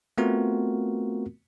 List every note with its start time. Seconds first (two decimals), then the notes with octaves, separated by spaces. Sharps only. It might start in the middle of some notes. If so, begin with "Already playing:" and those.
0.18 A3 B3 C4 F4 F#4 A#4